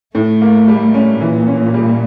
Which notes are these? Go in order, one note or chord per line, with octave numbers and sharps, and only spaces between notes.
A2 A3
A#3
G3
C#4
A#2 E3
C#4
G3